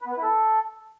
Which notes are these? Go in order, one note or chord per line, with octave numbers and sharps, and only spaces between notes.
B4
B3
B4
E4
A4